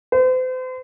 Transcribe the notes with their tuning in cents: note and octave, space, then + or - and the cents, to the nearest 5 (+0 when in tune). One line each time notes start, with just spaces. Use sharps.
C5 -40